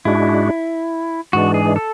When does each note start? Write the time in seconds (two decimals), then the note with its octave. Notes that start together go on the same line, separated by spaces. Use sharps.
0.05 G#2 G#3 D4 E4 F#4
1.33 G#2 E3 G#3 D4 F#4
1.54 G#4
1.76 A4